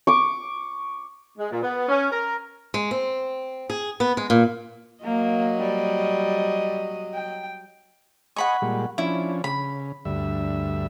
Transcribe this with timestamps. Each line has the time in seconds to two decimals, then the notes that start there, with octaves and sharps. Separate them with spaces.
0.07 C#6 D6
1.38 G#3
1.51 A#2
1.62 B3
1.88 C#4
2.11 A#4
2.74 G#3
2.91 C4
3.70 G#4
4.00 B3
4.17 G#3
4.30 A#2
5.04 F#3 A#3 D#5
5.60 G3
7.14 G5
8.36 D#5 F#5 G#5 B5 C#6
8.62 A#2 G3 G#3
8.98 F3 C#4 D4 E4
9.44 C#3 B5
10.05 D2 G2 E5